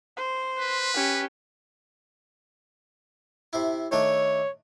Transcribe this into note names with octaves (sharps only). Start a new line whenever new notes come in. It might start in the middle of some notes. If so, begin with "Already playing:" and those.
C5
B4
C#4 G4
C3 E4
D#3 A3 D4 C#5